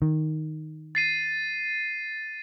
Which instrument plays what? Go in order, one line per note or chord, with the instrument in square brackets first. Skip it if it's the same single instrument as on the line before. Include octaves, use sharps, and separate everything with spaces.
[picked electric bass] D#3
[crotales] A6 C7 D#7